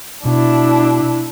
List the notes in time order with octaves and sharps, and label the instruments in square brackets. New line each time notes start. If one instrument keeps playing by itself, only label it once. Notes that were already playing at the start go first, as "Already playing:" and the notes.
[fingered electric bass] B2 [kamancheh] D4 E4